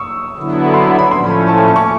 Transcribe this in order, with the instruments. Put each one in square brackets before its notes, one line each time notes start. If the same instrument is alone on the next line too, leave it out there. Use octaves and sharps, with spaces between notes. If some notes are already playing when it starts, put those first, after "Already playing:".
Already playing: [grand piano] C#6 D#6 E6
[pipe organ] D3 F#3 B3 E4
[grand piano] C6
B5
B5
[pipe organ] A2 F3 A3 C#4 [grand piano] C6
[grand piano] B5
A5
G#5
A5
C#6